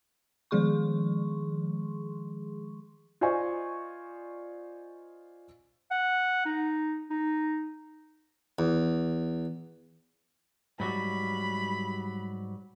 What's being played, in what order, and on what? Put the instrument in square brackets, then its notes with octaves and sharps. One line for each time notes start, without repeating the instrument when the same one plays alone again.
[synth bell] D#3 F3 G#3 G#4 C6 C#6
[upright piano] F4 C5 D5 D#5 G#5 C#6
[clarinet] F#5
D#4
D#4
[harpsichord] E2
[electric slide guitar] G#2 F#3 G3 [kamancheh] B5